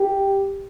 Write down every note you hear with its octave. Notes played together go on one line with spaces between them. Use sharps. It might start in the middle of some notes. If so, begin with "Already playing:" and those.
Already playing: G4